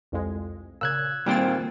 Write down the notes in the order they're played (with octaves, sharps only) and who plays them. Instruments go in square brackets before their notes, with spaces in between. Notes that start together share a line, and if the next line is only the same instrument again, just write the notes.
[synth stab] C2 F2 G#3
[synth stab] A#2 C#3 [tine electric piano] E6 F#6 G#6
[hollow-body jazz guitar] A#2 D#3 C4 [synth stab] G3 C5 A6